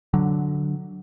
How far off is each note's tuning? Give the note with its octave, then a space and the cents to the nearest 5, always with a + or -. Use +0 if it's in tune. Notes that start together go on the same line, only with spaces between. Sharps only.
D3 +0 F#3 +0